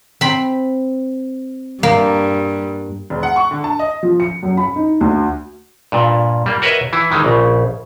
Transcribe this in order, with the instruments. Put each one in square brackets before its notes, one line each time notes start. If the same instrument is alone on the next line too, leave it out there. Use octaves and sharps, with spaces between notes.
[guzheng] C4 B5
[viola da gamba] G2 [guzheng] A#3
[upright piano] E1
F#5
C#6
D3
A5
D#5
[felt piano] F3
C#7
F#2
B5
D#4
D2
[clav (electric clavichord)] G2 A#2
G3 A#3
F#4 A#4 B4 C#5 D#5 E5
E3 E4
D#3 E3 G#3
A#1 C#3